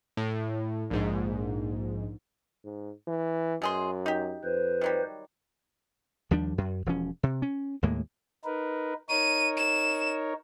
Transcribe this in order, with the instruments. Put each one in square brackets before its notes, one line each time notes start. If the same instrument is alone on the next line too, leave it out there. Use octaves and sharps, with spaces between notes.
[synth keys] A2
A#1 G#2
[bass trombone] G#2
E3
[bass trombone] F#2 [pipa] B2 G#4 C6
[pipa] D#4 G4
[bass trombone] F2 [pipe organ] B4 C5
[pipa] D#3 F#3 G3
[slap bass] D#2 F3 G3 D4
F#2
E1 F3 C#4
C3
C#4
D#2 A2 G#3 A#3
[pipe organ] D#4 A#4 B4
[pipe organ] D#4 A#4 C#5 [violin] D#7
[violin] E7